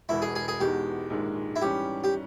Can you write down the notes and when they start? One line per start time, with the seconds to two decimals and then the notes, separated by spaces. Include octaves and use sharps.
0.09 E1 E2 B2 E4
0.22 G#4
0.35 G#4
0.48 G#4
0.60 E2 B2 G#3 D#4 G4
1.10 A#1 G#2 D#3 G#3
1.56 E4
1.61 G#2 E3 G3 C#4 G4
2.04 G4